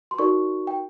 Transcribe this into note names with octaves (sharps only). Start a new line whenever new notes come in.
C6
D#4 F#4 A#4 D5 C#6
G5